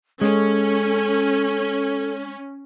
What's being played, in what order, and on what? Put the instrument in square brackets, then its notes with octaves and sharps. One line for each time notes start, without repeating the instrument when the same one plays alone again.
[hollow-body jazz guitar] G#3 [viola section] C#4 [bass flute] A4